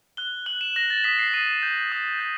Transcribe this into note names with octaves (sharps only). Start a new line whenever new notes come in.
F#6 G7
F#6 F#7
E7
F#6 A#6
A6
D#6 B6
C7
D#6 D#7
G6
D#6
G6